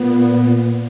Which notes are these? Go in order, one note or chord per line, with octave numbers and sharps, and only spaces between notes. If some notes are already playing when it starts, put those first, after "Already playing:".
Already playing: A#2 B3